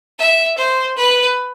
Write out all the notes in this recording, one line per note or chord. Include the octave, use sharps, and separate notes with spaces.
E5
C5
B4